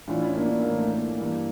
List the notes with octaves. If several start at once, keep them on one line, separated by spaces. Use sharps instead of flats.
A2 E3 D4 F4
C#4 E4
A#3 D4
A#3 D4
A2 E3 A#3
A3
A#3
A3
G2 E3 A#3